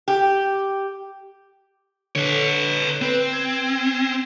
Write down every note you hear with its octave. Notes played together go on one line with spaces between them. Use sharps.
G4
D3 B4 C#5
C4 B4
G#6